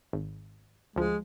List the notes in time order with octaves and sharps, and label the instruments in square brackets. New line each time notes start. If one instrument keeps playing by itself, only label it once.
[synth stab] G#1
[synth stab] D2 F3 [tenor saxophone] G#3